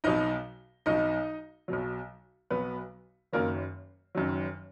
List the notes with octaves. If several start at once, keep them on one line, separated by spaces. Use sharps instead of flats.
B1 B2 F#3 D#4 D#5
B1 B2 F#3 D#4 D#5
B1 B2 F#3
B1 B2 F#3 B3 B4
F#1 F#2 D#3 F#3 A#3 A#4
F#1 F#2 D#3 F#3